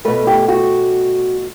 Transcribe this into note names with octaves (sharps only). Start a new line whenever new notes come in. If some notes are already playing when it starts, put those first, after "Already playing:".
B2 A3 B4
G4
F#4